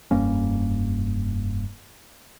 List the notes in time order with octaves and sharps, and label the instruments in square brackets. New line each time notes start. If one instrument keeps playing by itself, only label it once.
[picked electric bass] F1 G2 A#3 C#4